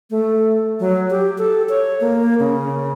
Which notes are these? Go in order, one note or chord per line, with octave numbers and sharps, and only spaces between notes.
A3
F#3
G4
A4
C#5
A#3
C#3